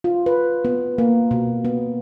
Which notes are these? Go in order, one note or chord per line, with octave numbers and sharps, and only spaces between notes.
F4
B4
B3
A#3
B2
B3